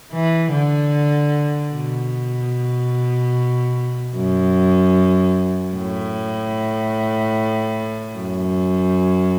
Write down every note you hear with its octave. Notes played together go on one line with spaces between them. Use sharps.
E3
D3
B2
F#2
A2
F#2